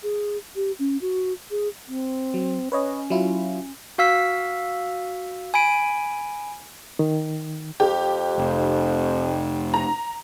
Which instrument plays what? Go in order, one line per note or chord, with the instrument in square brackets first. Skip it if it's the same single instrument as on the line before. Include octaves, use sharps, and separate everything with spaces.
[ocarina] G#4
G4
C#4
F#4
G#4
[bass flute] C4
[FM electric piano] F#3
[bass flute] C#4 [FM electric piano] B4 C#5 D#5
[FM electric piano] F#3 E4 F4
[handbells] F#4 F5 E6 B6
G#5 B5 D7
[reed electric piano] D#3
[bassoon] F2 [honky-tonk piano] G4
[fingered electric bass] F1
[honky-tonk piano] A#5